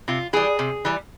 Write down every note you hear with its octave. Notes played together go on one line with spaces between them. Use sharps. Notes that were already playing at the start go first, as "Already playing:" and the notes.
C3 F4
E3 G3 G#4
C3
E3 G3